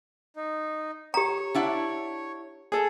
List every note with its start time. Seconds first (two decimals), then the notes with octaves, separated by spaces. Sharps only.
0.36 D#4
1.14 G4 C#5 A#5
1.55 D4 E4 F#5
2.72 G#4 A4